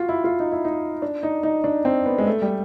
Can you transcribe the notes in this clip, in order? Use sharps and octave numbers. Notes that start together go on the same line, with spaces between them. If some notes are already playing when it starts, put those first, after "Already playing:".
Already playing: F4 F#4
E4
F4
D#4
E4
D#4
D4
D#4
D#4
D4
C4
B3
G#3
A3
G3